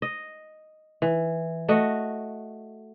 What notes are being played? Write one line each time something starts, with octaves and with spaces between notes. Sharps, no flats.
D#5
E3
A3 F#4 D#5